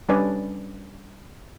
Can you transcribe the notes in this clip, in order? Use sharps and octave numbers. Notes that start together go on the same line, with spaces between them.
G3 C#4 D4 B4 D5 G#5